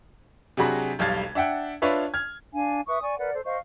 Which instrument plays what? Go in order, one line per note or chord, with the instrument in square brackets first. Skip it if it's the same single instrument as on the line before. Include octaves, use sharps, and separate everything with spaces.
[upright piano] C3 F#3 D4 F#4 G#4 B5
E1 B1 G3 F5 G#6 A6
D4 E5 F#5 G5
D4 F4 B4 C#5 E5
F6 G#6
[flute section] D4 F5 G#5
B4 E5 C#6 D#6
D5 G#5 C#6
A#4 B4 D5 F#5
A4 C5
C5 D#5 F5 C#6